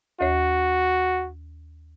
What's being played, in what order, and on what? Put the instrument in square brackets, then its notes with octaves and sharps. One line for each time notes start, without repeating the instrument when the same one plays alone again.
[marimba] D#2 C#5 [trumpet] F#4